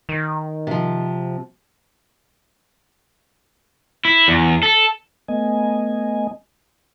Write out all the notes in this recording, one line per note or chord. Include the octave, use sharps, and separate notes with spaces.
D#3
C3 F3
E4
E2
A4
A3 B3 D#5 G#5